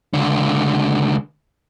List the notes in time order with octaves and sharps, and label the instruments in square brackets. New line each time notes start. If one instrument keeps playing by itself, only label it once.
[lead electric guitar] C#2 D3